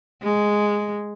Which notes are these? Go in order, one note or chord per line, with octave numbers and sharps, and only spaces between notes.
G#3